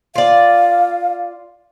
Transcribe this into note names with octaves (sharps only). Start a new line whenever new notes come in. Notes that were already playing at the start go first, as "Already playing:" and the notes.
F4 D5 F5